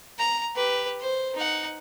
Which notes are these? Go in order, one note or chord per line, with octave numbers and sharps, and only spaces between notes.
A#5
G4 B4
C5
D#4 F#5